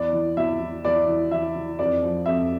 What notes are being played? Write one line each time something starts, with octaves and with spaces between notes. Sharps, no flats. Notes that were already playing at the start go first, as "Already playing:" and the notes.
Already playing: E2 D5
E3
E2 E5
E3
E2 D5
E3
E3 E5
E3
F2 D5
F3
F2 E5